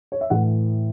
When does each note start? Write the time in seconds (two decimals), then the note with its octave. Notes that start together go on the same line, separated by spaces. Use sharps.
0.12 C#5
0.21 E5
0.30 A2 E3 F#5